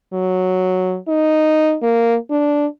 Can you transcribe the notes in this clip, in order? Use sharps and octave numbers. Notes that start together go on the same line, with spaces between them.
F#3
D#4
A#3
D4